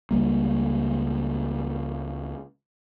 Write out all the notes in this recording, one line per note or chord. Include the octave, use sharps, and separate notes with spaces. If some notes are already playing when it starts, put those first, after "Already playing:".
C#2 G3 A#3